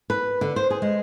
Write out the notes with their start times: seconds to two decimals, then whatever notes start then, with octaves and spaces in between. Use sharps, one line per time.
0.10 B4
0.41 D3
0.56 C5
0.70 G#4
0.82 G#3